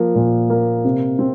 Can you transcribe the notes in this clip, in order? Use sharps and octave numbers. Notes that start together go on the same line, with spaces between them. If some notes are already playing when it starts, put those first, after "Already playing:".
Already playing: F3 A#3
A#2
A#3
C3
C4